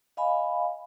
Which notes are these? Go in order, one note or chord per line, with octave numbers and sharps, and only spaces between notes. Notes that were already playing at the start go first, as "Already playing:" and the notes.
D#5 F5 G#5 B5